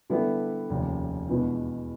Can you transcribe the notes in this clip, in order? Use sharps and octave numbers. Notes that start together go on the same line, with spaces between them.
D3 G3 B3 E4 A4
F1 D#2 C#3
E2 B2 G#3 B3 D4